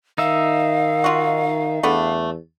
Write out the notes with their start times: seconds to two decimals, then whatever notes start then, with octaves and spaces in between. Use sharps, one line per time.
0.18 D#3 D#4 E5 F5
1.04 F4 F#4
1.83 E2 A3 B3 D4